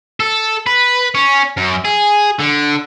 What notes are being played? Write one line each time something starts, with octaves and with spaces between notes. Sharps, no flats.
A4
B4
C#4
F#2
G#4
D3